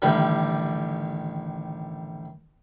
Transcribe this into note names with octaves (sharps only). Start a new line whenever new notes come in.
A1 D3 D#3 G3